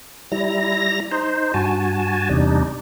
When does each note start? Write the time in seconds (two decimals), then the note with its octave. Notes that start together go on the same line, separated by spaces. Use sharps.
0.32 G3 E4 A#5 A#6
1.12 D#4 C5
1.54 G2 F#4 G#5 A5
2.30 E2 C3 G3 D4 D#4